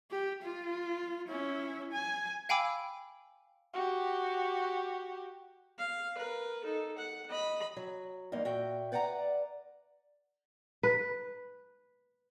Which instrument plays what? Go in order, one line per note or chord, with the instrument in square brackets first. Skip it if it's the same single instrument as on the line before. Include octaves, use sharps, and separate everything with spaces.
[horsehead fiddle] G4
F4
C#4 E4
G#5
[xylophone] F5 G5 G#5 B5 D6 E6
[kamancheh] F#4 G4
[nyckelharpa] F5
A#4 B4
D#4 A4
F#5
D#5 B5
[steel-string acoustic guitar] F#3
E2 G2 A#3 D#4
A#2 F#4 E5 G5
B4 D5 F#5 G5 A#5
[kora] B4